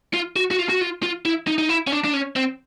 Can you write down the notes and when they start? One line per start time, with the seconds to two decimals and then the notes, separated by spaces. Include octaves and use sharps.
0.14 F4
0.36 F#4
0.51 F#4
0.59 F4
0.69 F#4
0.81 F4
1.03 F4
1.25 E4
1.47 D#4
1.58 D#4
1.69 E4
1.87 C#4
1.92 D4
2.04 D4
2.13 C#4
2.36 C4